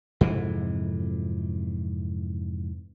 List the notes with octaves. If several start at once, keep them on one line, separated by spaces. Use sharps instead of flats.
F2 G#2 C3 E3